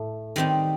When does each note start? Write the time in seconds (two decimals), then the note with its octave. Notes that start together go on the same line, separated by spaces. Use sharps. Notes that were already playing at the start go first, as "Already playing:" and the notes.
Already playing: A2 A3
0.36 D#3 G3 C4 D#4